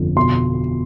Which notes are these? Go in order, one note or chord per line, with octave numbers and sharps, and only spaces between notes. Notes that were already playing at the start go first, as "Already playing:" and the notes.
Already playing: G1 F2
B2 C6